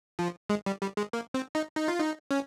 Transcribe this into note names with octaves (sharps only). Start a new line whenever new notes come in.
F3
G#3
G3
G3
G#3
A#3
C4
D#4
D#4
F4
D#4
C#4